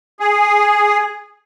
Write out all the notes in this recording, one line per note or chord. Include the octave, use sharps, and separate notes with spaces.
G#4